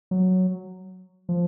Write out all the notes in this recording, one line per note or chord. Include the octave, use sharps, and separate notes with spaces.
F#3
F3